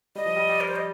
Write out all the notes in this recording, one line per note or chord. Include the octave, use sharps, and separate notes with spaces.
G3 D#5
F3
G3
G3
A#4
C5
D#5